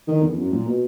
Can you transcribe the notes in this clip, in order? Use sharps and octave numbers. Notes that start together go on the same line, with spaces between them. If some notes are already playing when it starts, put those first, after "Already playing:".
D#3
E2
F#2
A#2
B2